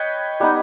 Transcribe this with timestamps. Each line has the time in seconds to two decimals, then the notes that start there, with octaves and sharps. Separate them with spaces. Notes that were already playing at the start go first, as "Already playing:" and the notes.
Already playing: B4 C#5 D#5 G5
0.40 G3 B3 D#4